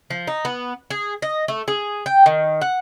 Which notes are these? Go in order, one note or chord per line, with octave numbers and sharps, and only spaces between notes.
F3
D#4
B3
G#4
D#5
A3
G#4
G5
D#3
F#5